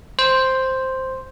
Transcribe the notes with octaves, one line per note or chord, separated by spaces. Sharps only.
C5